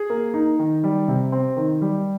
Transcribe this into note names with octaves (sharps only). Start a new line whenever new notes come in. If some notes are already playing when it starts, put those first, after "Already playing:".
Already playing: G#4
A#3
D#4
D#3
G3
C3
C4
D#3
G3